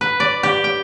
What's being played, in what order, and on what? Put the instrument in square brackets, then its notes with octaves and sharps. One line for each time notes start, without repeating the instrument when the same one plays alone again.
[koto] B4
D5
G4
G5